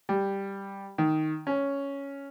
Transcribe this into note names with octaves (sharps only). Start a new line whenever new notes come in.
G3
D#3
C#4